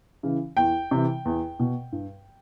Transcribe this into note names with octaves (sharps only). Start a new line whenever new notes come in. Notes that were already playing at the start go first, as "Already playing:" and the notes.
C#3 E3
E2 G5
C3 E3
E2
B2
G2